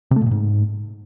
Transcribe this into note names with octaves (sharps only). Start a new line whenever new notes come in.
C3
A3
A#2
A2
G#2